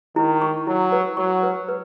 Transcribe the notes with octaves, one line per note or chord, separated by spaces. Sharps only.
D#3 E4
C#6
F#3 E4
B4
F#3 C#6
B4
B4